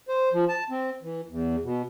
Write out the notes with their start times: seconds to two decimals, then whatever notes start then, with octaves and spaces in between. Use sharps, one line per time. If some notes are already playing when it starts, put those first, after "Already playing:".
0.09 C5
0.33 F3
0.48 A5
0.70 C4
1.02 E3
1.29 E2
1.63 B2